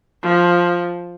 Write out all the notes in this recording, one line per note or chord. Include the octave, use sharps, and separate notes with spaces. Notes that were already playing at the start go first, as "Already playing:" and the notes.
F3